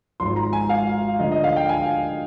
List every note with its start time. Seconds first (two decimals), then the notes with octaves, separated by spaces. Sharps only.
0.20 G#1 G#2 F3 C6
0.36 A#5
0.53 G#5
0.69 F5
1.19 D2 D3 F3 D#5
1.32 D#5
1.44 F5
1.56 G5
1.69 G#5